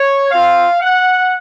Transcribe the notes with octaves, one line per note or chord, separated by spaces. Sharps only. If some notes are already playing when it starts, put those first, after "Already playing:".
Already playing: C#5
C4 F4 F5
F#5